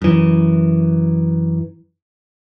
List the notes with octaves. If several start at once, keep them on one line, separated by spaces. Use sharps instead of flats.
F#2 E3